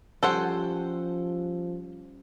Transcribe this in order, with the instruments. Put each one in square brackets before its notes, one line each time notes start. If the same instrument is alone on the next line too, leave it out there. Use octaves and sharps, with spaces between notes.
[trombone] F3 [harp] G3 C#4 G4 [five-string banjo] A4 C5 F#5